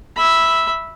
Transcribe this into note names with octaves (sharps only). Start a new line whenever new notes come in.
E5 B5